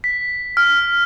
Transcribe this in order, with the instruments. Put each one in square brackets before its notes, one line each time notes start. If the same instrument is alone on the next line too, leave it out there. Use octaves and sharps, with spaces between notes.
[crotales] B6
F6